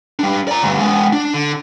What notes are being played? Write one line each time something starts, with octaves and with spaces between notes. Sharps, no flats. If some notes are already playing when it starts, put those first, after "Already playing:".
G3 D4
D5 A#5
D2 G2
G#3 B3
D4
D3